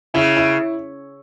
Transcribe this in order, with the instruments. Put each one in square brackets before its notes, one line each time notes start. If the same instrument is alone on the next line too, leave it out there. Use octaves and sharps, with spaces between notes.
[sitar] C#3 [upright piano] E4
[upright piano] E4